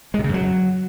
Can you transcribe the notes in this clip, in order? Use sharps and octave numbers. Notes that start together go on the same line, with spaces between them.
G#3
C3
C#3
F#2
F#3